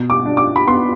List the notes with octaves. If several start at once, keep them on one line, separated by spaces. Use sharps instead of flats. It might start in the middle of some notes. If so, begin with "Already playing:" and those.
Already playing: B2
D6
D4
D6
B5
B3 C6